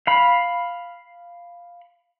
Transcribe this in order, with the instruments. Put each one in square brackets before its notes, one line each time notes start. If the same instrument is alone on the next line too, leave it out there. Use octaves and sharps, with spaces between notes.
[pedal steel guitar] F5 B5